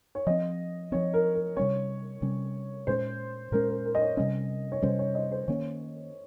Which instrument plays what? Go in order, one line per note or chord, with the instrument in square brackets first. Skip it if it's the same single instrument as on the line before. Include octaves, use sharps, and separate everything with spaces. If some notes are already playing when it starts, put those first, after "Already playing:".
[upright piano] C#5
[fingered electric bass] F3 C4 [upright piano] D#5
[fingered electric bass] F3 C4 [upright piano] C#5
[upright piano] A#4
A#4
[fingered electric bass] C3 G3 C#4 [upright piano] C#5
[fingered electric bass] C3 G3 C#4
[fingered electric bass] A#2 G#3 C#4 [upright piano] C5
[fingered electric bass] A#2 G#3 C#4 [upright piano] A#4
[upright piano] A#4
A#4
D#5
C#5
[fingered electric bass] C3 G3 C#4 [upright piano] D#5
[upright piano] C#5
[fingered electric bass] C3 G3 C#4 [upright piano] C5
[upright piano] C#5
D#5
C5
[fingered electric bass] D#3 A#3 C#4 [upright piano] C#5